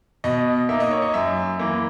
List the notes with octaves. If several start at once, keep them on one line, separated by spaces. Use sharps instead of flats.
B2 D#5
A#3 D#4 E5
D#5
C#5
D#5
F#2 E5
E3 A#3